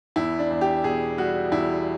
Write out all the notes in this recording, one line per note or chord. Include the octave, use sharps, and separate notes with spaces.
E2 E4
D4
E2
G4
B2 G#4
G3 F#4
E2 E4